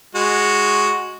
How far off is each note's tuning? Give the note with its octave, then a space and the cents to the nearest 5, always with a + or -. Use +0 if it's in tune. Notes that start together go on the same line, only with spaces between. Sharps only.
G#3 +0 F#4 +0